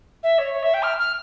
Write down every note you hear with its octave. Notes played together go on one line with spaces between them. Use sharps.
E5
C#5
C#5
E5
G5
F6
F6